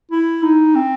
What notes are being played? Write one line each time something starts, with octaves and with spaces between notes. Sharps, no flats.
E4
D#4
C4